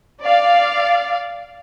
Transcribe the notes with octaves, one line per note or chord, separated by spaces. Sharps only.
D5 F5